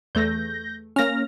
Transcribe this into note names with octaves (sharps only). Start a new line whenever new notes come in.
E2 A3 G6 A#6
A#3 C#4 F6 A#6